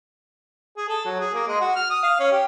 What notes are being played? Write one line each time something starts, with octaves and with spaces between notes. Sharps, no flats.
G#4
A4
F#3
G#4
A#3
G#3
F#4
F6
D#6
F5
C#4
G4